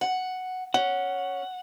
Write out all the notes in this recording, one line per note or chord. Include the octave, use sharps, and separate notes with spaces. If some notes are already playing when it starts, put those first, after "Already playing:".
F#5
C#4 F#5